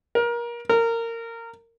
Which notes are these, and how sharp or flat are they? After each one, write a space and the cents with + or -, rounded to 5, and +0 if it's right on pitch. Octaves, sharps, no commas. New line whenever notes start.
A#4 +25
A#4 -20